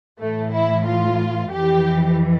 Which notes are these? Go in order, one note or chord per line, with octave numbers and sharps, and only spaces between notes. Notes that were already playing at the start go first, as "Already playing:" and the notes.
A2 E3 A3
E4
F4
F2 E3 G4